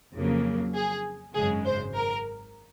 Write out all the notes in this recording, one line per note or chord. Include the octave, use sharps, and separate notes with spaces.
F2 C#3 F#3 A#3
G#4
G#1 F#2 C#3 G#3 G#4
C5
A#4